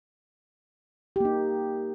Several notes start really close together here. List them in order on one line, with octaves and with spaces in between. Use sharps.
G4 A#3 D#4